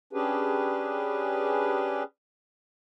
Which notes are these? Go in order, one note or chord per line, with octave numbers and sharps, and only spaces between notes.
C#4 D4 G4 G#4 B4